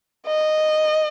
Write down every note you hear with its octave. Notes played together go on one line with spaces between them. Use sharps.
D#5